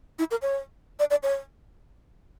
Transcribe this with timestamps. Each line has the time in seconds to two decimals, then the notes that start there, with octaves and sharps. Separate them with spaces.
0.19 E4
0.31 A#4
0.42 C#5
0.99 D5
1.10 D5
1.23 C#5